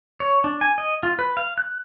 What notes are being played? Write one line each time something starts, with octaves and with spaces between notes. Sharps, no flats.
C#5
D4
G#5
D#5
F4
B4
F5
F#6